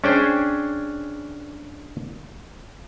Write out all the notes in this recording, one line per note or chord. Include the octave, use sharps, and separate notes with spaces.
C#4 D4 G#4 C5 G5